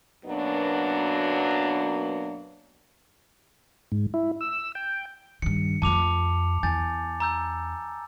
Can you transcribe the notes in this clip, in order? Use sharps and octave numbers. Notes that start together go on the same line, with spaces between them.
F#2 B2 F#3 A#3 B3 D4
G#2
E4
E6
G5
G2 D#3 C#7
F2 A3 A5 D6 F7
E2 G#5 G6 A6
A#5 E6 G6